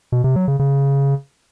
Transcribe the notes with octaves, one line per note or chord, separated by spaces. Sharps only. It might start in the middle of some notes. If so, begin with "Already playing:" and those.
B2
C3
F#3
C#3
C#3